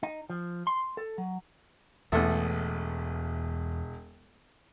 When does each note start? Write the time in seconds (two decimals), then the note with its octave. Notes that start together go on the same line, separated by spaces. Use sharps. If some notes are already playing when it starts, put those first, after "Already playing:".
0.03 D#4
0.30 F3
0.67 C6
0.97 A4
1.18 F#3
2.12 E1 A1 E2 B3 E4 A4 E5